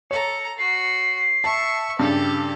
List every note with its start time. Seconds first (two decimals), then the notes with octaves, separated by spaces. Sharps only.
0.11 A4 C#5 A#5 C#7
0.59 F#4 C7
1.44 E5 A5 C#6
1.99 G2 C#3 G4 A4